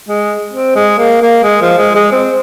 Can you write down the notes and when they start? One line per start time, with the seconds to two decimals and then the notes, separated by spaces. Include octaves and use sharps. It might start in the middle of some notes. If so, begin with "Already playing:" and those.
0.09 G#3
0.53 C4
0.76 G#3
0.98 A#3
1.22 A#3
1.43 G#3
1.62 F3
1.78 G#3
1.95 G#3
2.11 C4